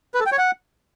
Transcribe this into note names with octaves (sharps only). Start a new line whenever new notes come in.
B4
A4
G5
C#5
F#5